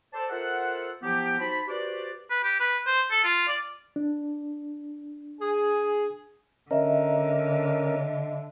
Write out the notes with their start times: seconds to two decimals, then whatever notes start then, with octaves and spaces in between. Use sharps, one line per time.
0.13 A4 C5 D5 A5
0.30 F4 A4 A#4 C5 E5 F#5
1.02 F3 F#3 B3 E4 G4
1.39 D#4 F#4 C5 A5 B5
1.68 F#4 G4 B4 C5 D5
2.30 B4
2.43 G4
2.60 B4
2.86 C5
3.11 A4
3.24 F4
3.48 D5
3.96 D4
5.40 G#4
6.71 D3 C#4 A#4 D#5 E5